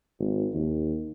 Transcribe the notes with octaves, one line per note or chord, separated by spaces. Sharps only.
G#1
D#2